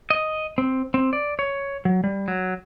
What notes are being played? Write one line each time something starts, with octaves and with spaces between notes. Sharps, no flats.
D#5
C4
C4
D5
C#5
F#3
G3
F#3